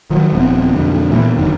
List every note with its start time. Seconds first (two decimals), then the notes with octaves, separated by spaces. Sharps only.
0.10 D#3 F3 F#3
0.32 D#1 F3 B3 C4
0.73 B1 F2 D3
1.10 A#2 E3 F3 B3
1.36 F#1 F#2 D3 D#3